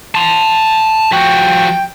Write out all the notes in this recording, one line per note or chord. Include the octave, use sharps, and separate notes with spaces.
A5 C6
F3 F#4 G5